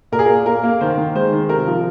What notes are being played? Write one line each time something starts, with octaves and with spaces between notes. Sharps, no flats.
A#2 A#4
G#4
A#3 A#4
A#3 A#4
A#3
D#3 C5
D#3
G#3 C5
D#3
C3 A#4
F3